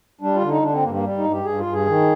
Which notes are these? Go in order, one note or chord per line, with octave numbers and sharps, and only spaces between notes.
G3 D4
F4
D3
D#4
D3 D4
C4
G2 A#3
A#3
G3
D#4
G2
G4
G2 G#4
F4
G2
G#4
D#3